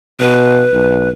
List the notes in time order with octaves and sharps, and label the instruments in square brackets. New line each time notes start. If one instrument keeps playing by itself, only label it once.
[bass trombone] B2 [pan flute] B4
[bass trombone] B1